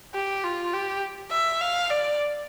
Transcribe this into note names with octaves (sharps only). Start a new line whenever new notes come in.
G4
F4
G4
E5
F5
D5